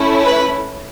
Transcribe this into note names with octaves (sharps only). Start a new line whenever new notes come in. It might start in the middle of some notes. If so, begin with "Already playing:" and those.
Already playing: A3 C#4 E4
B4 B5